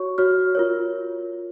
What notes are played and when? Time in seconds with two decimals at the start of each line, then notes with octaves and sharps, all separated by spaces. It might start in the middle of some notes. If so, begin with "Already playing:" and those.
Already playing: F#4 C#5 C#6
0.18 F#4 C#5 F6
0.55 F4 A#4 C#5